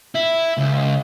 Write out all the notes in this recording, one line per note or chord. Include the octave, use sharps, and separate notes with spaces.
E4
C#2